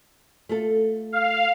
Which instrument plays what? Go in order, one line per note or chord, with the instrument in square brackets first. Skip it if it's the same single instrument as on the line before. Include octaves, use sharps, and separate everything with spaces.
[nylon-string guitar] A3 F4 A4
[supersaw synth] F5